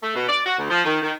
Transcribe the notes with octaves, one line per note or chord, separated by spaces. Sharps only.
A3
B2
D5
F#4
D2
F3
D#3
D#3